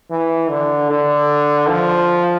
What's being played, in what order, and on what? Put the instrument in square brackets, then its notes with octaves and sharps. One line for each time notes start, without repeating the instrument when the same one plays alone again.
[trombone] E3
D3
D3
F3